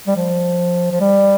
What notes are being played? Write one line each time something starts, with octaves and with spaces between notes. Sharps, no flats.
G3
F3
F3
G3